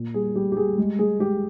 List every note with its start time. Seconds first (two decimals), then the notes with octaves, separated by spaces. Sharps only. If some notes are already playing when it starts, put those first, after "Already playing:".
Already playing: A#2
0.14 G3 G#4
0.36 G3 G4
0.52 G4
0.56 G3 G#4
0.78 G#3
0.99 G#3 G#4
1.19 G#3 G4